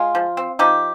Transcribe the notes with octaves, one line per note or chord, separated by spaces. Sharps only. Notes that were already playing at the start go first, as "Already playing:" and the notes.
Already playing: G#3 F4
F3
C4
F3 D#4 G4